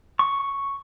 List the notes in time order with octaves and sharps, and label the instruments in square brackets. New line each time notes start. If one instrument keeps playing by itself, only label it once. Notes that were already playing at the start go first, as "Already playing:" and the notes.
[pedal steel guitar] C#6